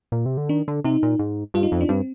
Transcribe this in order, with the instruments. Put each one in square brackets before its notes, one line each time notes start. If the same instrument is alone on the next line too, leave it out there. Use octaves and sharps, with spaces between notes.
[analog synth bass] A#2
C3
D3
[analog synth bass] D#3 [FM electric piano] D4
[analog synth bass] D3
[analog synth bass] C3 [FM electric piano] D#4
[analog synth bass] A#2
G#2
[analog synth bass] G2 [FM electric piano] F4
[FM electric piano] D#4
[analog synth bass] F2
[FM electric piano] D4
[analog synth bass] G2 [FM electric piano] C4